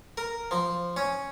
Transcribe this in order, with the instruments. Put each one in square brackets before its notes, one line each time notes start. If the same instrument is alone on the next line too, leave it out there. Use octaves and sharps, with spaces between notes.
[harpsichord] A#4
F3
C#4